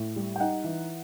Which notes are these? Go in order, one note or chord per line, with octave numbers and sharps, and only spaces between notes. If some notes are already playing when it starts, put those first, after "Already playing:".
Already playing: A2
G3
G5
D#4 F#5
E3